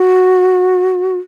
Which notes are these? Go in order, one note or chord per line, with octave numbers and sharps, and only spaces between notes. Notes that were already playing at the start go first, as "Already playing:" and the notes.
Already playing: F#4